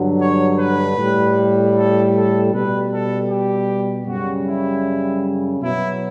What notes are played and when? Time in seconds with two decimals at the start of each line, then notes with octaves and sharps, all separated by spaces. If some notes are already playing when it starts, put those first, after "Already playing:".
Already playing: G2 D3 F#3
0.20 C#5
0.57 B4
0.97 A2 G3
1.75 A4
2.13 A4
2.51 B2 G3 B4
2.90 A4
3.28 G4
4.06 F#2 C#3 G3 F#4
4.46 E4
5.61 B2 F#3 E4